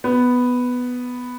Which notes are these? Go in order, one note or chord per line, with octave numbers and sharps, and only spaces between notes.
B3